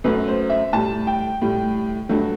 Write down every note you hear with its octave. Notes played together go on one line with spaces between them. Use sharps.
F#2 F#3 A3 B4
C5
E5
A2 G3 A5
G5
A2 G3
G2 F#3 A3